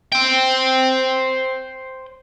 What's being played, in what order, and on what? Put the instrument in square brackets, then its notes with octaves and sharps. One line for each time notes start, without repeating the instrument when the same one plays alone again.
[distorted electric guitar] C5 G5